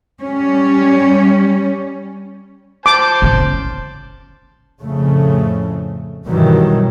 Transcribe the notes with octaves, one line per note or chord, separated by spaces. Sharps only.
G3 C#4
C5 A5 D6
F#1 C#4
F2 A2 C#3 A3
G2 B2 D#3 E3 F#3 G3